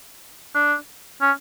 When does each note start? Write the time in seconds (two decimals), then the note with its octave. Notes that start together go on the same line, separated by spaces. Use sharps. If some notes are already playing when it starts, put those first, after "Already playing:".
0.55 D4
1.21 C#4